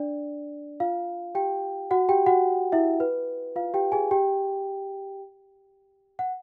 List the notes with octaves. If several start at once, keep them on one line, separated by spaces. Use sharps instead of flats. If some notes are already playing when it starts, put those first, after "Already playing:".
Already playing: D4 D5
F4 F5
G4 G5
F#4 F#5
G4 G5
F#4 F#5
E4 E5
B4
F4 F5
G4 G5
G#4 G#5
G4 G5
F#5